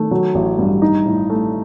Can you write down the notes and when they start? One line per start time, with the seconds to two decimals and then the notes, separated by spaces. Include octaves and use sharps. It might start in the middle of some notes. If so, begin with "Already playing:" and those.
Already playing: D#3 A3
0.11 F#3
0.35 A1
0.59 G2
0.82 D#4
1.05 A2
1.30 A3